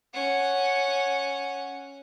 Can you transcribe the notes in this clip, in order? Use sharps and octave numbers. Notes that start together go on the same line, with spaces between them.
C#4 F#5